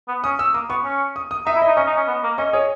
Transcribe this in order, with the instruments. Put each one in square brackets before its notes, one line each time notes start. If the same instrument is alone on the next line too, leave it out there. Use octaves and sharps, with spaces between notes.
[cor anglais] B3
[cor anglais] C#4 [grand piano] D#6
[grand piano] E6
[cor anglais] A#3 [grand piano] D#6
[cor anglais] B3 [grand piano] C#6
[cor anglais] C#4
[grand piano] D#6
D#6
[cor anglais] D#4 [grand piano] E5
[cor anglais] E4
[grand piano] D#5
[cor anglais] D#4
[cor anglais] C#4 [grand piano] D#5
[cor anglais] D#4
C#4
B3
A#3
[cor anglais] C#4 [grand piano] D#5
[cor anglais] G#4 [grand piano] C#5